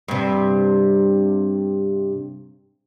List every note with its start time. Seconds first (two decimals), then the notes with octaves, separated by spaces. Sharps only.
0.08 G2 C3